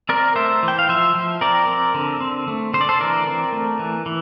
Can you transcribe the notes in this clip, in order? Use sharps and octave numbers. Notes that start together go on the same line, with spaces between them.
C4 A#4 D5
A3 C5 E5
E3
G5
F5
F3 C5 E5
F3
C4 A#4 D5
C4
D3
C4
A3
D3 C5
D5
A4 C5
E3 A#4 D5
C4
A3
E3
E3